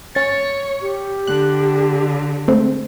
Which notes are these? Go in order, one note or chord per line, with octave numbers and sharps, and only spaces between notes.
C#4 C#5 A6
G4
D3 F#6
G#3 A3 C4